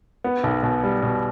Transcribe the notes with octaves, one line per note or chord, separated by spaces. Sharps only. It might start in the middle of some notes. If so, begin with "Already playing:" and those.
B3
B1
B2
G3
B2